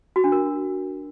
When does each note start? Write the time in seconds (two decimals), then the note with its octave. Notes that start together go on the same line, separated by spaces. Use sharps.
0.16 F#4
0.24 D4
0.32 A#4